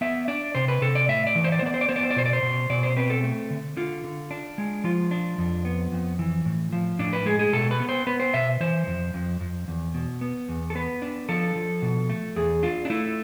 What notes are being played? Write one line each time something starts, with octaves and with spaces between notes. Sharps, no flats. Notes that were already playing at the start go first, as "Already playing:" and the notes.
B3 E5
D4 D5
C3 C5
B4
C3 A4
D5
A2 E5
D5
E3
C5
D5
C5
B3 D5
C5
D5
B3 C5
D5
C5
D5
B2 C5
D5
C5
B2
B2 D5
C5
C4 B4
A4
A3
D3
D3 F4
D3
D4
G#3
F3 F4
D4
F2
B3
F2
E3
A2
F3
A2 D4
B4
G#3 G#4
G#4
B2 A4
B4
B3
C5
B3 B4
C5
B2 E5
E3 C5
F2
F2
F2
E2
B2
B3
E2
A4
B3 B4
D4
F3 A4
F3
B2
A3
E2 G#4
D4 F4
D4
A3 E4